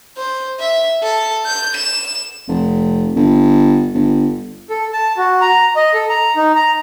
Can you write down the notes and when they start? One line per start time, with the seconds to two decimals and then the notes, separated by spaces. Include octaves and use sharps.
0.17 C5
0.60 E5
1.03 A4
1.46 G6
1.77 E7
2.48 F1
3.16 G1
3.94 G1
4.70 A4
4.93 A5
5.17 F#4
5.41 A#5
5.76 D#5
5.94 A4
6.09 A#5
6.36 D#4
6.55 A#5